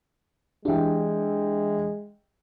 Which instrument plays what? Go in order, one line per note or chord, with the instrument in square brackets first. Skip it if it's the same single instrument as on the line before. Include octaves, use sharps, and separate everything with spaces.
[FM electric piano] E3 D4 [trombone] G#3 [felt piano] G4 E5 G5